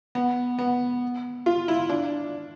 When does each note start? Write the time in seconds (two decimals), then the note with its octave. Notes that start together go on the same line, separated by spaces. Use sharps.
0.15 B3
0.58 B3
1.46 F4
1.68 E4
1.89 D4